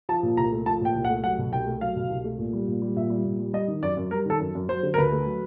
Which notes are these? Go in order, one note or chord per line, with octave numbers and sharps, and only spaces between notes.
F3 A5
A#2
C2 A#5
A3
F3 A5
A#2 G5
C2
F#5
A3
F#3 F#5
B2
C2 G5
A3
F#3 F5
B2
C2
A3
A#2
G3
A#2
G3
A#2 E5
G3
A#2
G3
G3 D#5
D#3
F#2 D5
F#2
G3 A#4
D#3 A4
F#2
F#2
F#3 C5
D3
A#4
D2 B4
A3
F#3